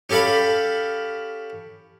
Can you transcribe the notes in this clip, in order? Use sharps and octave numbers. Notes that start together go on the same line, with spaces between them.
C#4 G4 A4 F5 B5